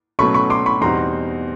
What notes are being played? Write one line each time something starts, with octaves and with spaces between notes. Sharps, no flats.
B2 F#3 A3 C#4 B5 C#6
B5 C#6
C6 D6
B5 C#6
E2 B2 G3 C4 D#4 A#5 C6